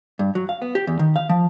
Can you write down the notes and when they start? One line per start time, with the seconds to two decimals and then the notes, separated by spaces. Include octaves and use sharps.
0.19 G2
0.35 F#3
0.49 F5
0.62 B3
0.75 G4
0.87 E2
0.99 D#3
1.16 F5
1.29 F3